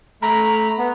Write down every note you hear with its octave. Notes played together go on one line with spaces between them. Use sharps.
A3 A#5 B5
B3